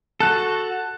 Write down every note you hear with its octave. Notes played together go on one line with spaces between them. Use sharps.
F#4 A4 A5 F#6